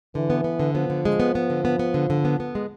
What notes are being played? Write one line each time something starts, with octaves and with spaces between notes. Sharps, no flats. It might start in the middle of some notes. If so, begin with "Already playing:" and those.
D3 E3
B3
B3
D3
F3 B3
D3
G#3
B3
B3
D3
B3
B3
D3
D3
B3
B3
G#3